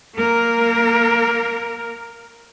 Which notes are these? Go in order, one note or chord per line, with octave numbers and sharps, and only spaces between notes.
A#3 A#4